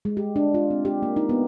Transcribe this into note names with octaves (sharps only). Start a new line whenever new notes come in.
G#3
G4
D4
F4
C4
G4
A#3
D#4
B3